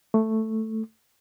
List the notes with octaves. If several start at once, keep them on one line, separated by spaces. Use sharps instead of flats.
A3